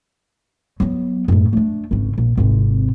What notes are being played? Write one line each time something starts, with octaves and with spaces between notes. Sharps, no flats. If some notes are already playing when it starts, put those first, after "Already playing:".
F#3 B3
F#2 A2
A3 D4
G#1 C#3
A#1
G#1 C3